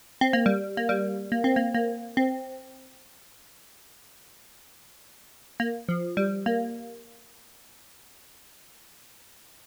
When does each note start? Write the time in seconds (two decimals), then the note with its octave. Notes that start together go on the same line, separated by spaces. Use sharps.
0.21 C4
0.33 A#3
0.46 G3
0.77 A#3
0.89 G3
1.32 A#3
1.44 C4
1.56 A#3
1.74 A#3
2.17 C4
5.60 A#3
5.89 F3
6.17 G3
6.46 A#3